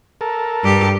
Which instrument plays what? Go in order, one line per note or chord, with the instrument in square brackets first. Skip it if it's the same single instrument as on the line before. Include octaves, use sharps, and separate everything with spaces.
[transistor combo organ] A4 A#4
[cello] G2 G4